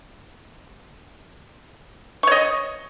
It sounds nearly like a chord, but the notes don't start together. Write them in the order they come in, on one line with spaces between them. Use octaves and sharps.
C#6 C#5 D#5